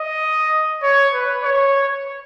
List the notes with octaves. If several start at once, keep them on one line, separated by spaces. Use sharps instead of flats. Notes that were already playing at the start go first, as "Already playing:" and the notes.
Already playing: D#5
C#5
B4
C#5